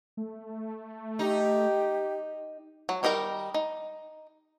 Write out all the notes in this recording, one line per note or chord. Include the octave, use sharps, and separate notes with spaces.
A3
D#4 G4
F#3
D#3 G3 D#4 A#4 A#5
D#4